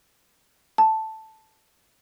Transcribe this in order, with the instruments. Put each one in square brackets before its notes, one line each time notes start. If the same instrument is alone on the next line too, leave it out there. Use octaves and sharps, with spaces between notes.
[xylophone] A5